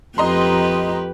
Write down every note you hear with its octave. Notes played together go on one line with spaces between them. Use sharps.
F2 G4 B4 D#5 A#5 C6